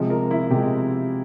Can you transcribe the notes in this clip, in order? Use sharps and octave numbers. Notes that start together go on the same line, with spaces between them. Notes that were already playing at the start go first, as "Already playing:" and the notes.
Already playing: C3 F3 G#3
A#4
E4
C3 F3 G#3 G4